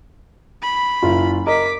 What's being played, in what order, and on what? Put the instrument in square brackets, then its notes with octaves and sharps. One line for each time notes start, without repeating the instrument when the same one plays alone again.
[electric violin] B5
[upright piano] F#1 F4
[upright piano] A#4 D#5 [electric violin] D6 B6